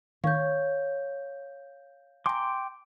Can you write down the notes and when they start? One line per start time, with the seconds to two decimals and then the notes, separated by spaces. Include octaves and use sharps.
0.24 D#3 C#5 F5 G6
2.26 G5 G#5 A#5 C6 D6